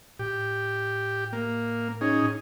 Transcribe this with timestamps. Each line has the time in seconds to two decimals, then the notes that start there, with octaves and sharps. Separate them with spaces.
0.19 A2 G4
1.32 A#3
2.01 C#4 D#4 G#4